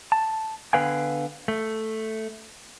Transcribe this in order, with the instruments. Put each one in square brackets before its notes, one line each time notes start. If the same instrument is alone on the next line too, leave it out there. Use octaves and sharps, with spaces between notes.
[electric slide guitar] A5
D3 B3 B4 F5 G5 G#5
A3